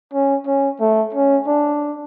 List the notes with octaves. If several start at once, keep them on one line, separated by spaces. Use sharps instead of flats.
C#4
C#4
A3
C#4
D4